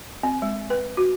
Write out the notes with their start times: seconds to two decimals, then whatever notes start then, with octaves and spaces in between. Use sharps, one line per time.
0.23 C4
0.42 G#3
0.70 B4
0.97 F#4